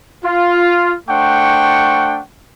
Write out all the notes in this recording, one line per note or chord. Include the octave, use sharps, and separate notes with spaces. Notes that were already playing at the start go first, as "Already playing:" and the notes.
F4
A3 D4 C5 F#5 G5 C#6